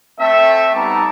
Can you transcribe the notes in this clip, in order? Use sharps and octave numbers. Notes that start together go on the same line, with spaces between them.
A3 C4 A4 E5
G3 B3 D#4 A5 A#5 D6